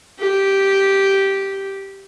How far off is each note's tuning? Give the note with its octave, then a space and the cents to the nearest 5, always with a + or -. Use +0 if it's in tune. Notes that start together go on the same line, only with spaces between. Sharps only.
G4 -5